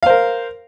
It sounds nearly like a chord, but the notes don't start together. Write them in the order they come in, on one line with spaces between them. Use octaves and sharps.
F5 C5 A#4